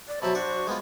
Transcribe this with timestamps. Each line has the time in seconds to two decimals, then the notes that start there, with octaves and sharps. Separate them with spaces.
0.08 D5
0.22 B2 F#3 C5 E5 A5 B5
0.35 D4 F#4 D5 C#6
0.67 G#3 B3 F4